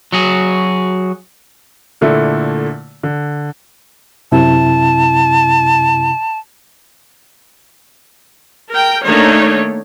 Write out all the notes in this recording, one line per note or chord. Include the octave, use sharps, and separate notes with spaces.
F#3 F#4 G#4
A#2 D3 A3 E4
D3
F#2 C3 E4 A5
A#4 G5
D#3 A3 A#3 D4 D#4 C#5